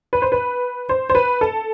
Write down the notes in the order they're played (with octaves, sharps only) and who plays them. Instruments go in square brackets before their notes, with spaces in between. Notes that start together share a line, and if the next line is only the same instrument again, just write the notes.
[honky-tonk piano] B4
C5
B4
C5
C5
B4
A4